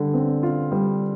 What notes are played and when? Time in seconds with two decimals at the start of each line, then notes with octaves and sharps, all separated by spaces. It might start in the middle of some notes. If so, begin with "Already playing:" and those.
Already playing: D3 G3
0.14 C4
0.43 F4
0.72 G3